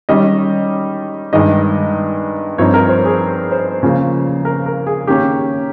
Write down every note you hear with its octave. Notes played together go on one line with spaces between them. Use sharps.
D#3 G3 C#4 D#5
G2 D#3 G#3 D#5
G2 F3 C4 D#4 C#5
A#4
C5
G#4
C5
C#3 F3 A#3
A#4
A#4
G#4
D#3 A#3 C#4 G4